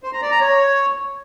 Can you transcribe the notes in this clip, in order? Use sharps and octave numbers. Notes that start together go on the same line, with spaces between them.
C5
A#5
D5
A#5
C#5